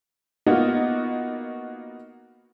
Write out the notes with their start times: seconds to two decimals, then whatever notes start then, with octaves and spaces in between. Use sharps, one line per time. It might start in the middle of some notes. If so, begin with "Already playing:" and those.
0.46 A#3 B3 D#4 F4 F#4